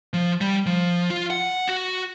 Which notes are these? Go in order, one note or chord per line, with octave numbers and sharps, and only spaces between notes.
F3
G3
F3
F4
F#5
F#4